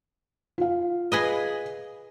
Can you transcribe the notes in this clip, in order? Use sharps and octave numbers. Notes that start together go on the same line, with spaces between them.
F4 F5
G#4 B4 D#5